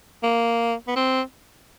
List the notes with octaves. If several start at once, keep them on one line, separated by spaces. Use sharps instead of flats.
A#3
B3
C4